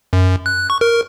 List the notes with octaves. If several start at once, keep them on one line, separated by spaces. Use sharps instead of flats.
F#2
F#6
C#6
A#4